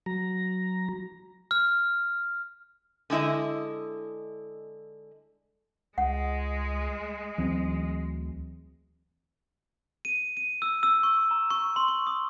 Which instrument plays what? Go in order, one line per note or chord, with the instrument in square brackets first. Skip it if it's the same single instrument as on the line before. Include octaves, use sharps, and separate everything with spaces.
[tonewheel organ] F#3 A#5
[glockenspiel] F6
[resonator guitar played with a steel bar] D3 G#3 E4 D#5
[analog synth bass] C#2 [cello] G#3 [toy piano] F#5
[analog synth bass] D2 [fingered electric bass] E3 F#3 C4
[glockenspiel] D#7
D#7
E6
E6
C#6
A#5
C#6
C6
C#6
D#6